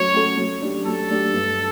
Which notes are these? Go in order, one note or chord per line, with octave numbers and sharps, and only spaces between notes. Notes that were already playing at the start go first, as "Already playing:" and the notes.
Already playing: F#3 A3 C#4 F#4 C#5
A3 C#4 F#4 A4
F#3
A3 D4 G4
F#3 A4
A3 D4 G4
G2